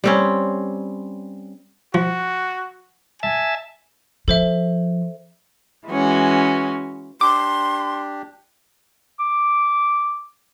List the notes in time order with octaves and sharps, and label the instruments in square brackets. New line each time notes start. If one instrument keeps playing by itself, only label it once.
[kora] G3 C4 C#4
[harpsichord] F3 [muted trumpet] F#4
[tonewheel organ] E5 A5 [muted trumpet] G#5
[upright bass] F3 [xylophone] A4 C5 E5
[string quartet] E3 G#3 C#4 F#4
[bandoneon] D4 G4 [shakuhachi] C6 [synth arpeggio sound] D6
[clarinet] D6